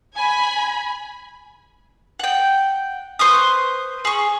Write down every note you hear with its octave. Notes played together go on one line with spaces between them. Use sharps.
G#5 B5
F#5 G5
B4 C5 C#6 D#6
G#4 C#6